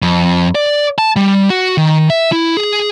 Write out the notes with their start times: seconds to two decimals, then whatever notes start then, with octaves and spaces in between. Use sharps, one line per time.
0.02 F2
0.55 D5
0.98 A5
1.16 G3
1.50 F#4
1.78 D#3
2.10 E5
2.32 E4
2.57 G#4